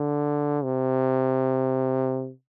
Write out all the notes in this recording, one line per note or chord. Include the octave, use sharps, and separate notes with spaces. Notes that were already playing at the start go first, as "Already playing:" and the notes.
Already playing: D3
C3